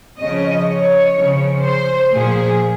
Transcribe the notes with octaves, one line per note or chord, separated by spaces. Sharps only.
C#3 F3 D#5
C#5
C#3 F3
C5
A#2 F3 G#4